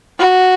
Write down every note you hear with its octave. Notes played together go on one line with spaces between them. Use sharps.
F#4